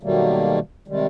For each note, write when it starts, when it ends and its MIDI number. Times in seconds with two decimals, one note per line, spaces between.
0.03 0.59 47
0.03 0.59 51
0.03 0.59 54
0.03 0.59 55
0.03 0.59 57
0.03 0.59 58
0.88 1.07 48
0.88 1.07 51
0.88 1.07 55
0.88 1.07 56